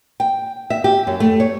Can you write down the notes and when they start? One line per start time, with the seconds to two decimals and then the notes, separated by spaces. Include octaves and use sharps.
0.20 G5
0.70 E5
0.84 G4
1.07 F#2
1.20 A3
1.40 C#5